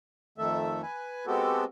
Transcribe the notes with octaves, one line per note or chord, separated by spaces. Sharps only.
F2 D#3 A3 A4 E5
B4 G#5
G#3 B3 C4 F#4 G4 A4